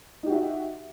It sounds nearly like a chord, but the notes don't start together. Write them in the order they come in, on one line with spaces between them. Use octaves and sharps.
D#4 G4 F#4 E5